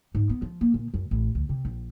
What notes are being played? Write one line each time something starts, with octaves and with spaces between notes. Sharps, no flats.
G#2
B3
F3
A#3
A#2
F#2
A1
D2
C3
A#1